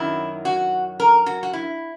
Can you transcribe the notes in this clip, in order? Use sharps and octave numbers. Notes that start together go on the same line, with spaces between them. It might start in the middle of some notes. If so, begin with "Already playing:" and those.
Already playing: F#2 D#3 F#3 E4
F#4
A#4
F#4
F#4
E4